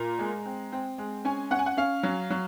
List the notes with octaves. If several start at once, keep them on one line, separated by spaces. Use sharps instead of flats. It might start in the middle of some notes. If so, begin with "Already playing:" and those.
Already playing: A#2 A#5
G#3
C4
C4
G#3
C#4 G#5
C#4 F#5
G#5
F#5
C#4 F5
F#3
F#3